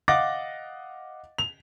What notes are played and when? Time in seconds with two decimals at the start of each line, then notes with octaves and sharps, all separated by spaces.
0.08 D#5 F5 F#5 D6 A6 A#6
1.38 F7